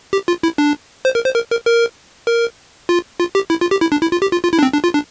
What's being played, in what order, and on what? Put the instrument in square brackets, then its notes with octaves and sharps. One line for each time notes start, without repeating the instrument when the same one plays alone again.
[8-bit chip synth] G4
F4
E4
D4
C5
A#4
C5
A#4
A#4
A#4
A#4
F4
F4
G4
E4
F4
G4
E4
D4
E4
F4
G4
F4
F4
E4
D4
C4
D4
F4
D4